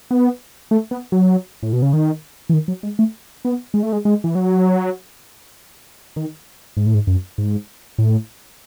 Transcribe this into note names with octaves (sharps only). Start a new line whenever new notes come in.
B3
A3
B3
F#3
A2
B2
C#3
D#3
E3
D#3
F#3
G#3
A3
B3
G#3
A3
G#3
G#3
E3
F#3
D#3
G#2
A2
G#2
F#2
G#2
A2